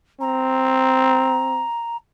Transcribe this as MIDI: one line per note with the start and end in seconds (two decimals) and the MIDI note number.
0.21 1.64 60
0.21 1.97 82